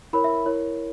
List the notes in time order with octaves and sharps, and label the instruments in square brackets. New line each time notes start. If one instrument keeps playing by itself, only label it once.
[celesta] E4 A#4 C#5 B5
E5
E4 A#4 C#5